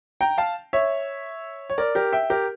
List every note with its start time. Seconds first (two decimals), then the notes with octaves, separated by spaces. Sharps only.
0.21 G5 A#5
0.38 F5 A5
0.73 C#5 E5
1.70 C#5
1.78 A#4 D5
1.95 G4 A#4
2.13 E5 G5
2.30 G4 A#4